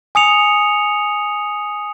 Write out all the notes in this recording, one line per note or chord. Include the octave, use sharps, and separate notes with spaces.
G#5 D#6 C#7 F7